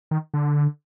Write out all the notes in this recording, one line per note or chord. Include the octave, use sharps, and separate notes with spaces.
D#3
D3